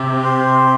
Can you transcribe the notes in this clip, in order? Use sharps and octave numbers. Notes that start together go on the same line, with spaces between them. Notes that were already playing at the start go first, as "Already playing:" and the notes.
Already playing: C3 G4
C5